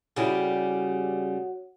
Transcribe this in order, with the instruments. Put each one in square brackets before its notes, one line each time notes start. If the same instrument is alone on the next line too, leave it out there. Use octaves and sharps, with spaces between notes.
[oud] C#3 G3 E4 [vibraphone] F#4 C#5 F#5